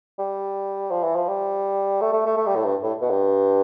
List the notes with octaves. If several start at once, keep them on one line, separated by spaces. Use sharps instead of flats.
G3
F3
E3
F3
G3
A3
A3
A3
A3
G3
A2
G2
A2
B2
G2